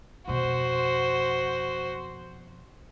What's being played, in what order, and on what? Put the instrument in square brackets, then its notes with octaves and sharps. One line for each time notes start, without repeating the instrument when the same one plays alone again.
[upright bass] F2 B2 [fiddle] F#4 C5